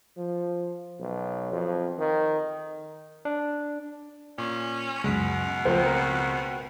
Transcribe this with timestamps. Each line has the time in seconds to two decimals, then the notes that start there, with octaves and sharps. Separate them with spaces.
0.17 F3
0.99 B1
1.52 F2
1.99 D#3
3.25 D4
4.38 A#2 C#4
5.04 C#2 F#2 B2 G#3 B6
5.65 C#2 F3 A3 C4 A#4 C5 G5
5.86 A#4